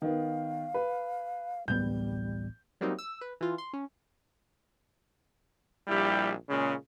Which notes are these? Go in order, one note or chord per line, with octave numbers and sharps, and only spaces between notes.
D#3 B3 F5
B4
D1 A1 G3 B3 G6
F#3 G3 A#3 C4 D#4
E6
B4
E3 F4
C6
C#4
A#1 G3 E4 G4
A#2 C#3 G#3 C#4